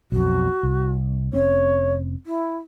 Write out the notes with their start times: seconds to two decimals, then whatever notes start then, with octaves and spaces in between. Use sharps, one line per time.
0.12 B1 F2 F#4
0.63 C2
1.33 F1 C4 C#4 C#5
2.26 E4